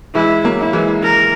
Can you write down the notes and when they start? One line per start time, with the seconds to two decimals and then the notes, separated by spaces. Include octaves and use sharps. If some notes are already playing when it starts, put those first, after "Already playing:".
0.15 E3 G#3 E4
0.44 F#3 A#3
0.59 E4
0.73 E3 G#3
1.03 A#4